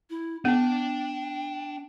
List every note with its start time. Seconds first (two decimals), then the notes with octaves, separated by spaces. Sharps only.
0.10 E4
0.45 B3 D4 G5 A5